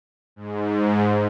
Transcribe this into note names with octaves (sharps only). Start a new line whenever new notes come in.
G#2